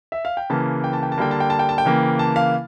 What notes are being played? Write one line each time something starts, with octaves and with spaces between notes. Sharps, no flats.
E5
F5
G5
C#3 E3 A#3 A5
G5
A5
G5
A5
D3 G3 A#3 G5
A5
G5
A5
G5
A5
G5
C#3 E3 A#3
A5
F5